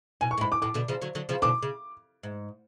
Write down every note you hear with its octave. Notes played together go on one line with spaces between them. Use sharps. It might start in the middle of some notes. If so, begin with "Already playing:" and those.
B2 G#5
C#6
A2
G#2 B5
D6
A2 D6
B2 D3
C#3 F3
D3 F#3
D3 F#3
C#3 F3
B2 D3 D6
C#3
G#2